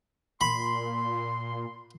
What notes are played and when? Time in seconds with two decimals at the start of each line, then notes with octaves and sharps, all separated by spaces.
0.41 A#2 B5 C6